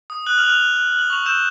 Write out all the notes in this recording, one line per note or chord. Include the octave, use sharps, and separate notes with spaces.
D#6
F#6 F#7
F6 F7
F#6
F6 F7
F#6
F#6
F#6
F#7
C#6 F7
E6 G6 E7